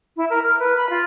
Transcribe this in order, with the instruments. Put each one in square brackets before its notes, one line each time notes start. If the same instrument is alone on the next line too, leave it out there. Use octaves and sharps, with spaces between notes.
[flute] E4
A#4
F6
B4
B5
F4